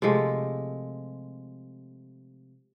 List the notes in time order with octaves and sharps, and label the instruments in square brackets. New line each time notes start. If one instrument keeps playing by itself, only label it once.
[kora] C3 F3 G#3 A3